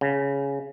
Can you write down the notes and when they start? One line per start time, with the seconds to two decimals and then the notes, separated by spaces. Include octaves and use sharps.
0.01 C#3